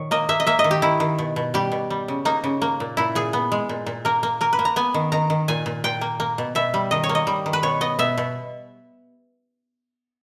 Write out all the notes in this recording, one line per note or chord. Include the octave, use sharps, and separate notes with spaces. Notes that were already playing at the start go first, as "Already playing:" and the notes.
Already playing: A#2 D#3 C#5
A#3 D#5
A#3 E5
D#5
A#3 E5
D#5
D#3
G4
D#3 E4
D#3
B2
B2
G3 G4
B2
G3
C#3
A#3 D#4
C#3
A#3
A#2
A#2 E4
A#2 G#4
B3
G#3
A#2
A#2
A#3 A#4
A#3
A#3 A#4
B4
A#3
A#5
B3 G#5
D#3
D#3 A#5
D#3
A#2 G#5
A#2
A#2 G5
A#3
A#3
B2
B2 E5
G3
D#3 D#5
C#5
A#3
D#5
G3
D#3
B4
B2 C#5
B3 D#5
B2 E5
B2